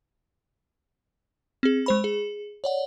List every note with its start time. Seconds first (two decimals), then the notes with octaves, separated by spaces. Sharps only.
1.63 C4 G#4
1.86 G#3 C5 B5
2.04 G#4
2.64 C#5 D5 F#5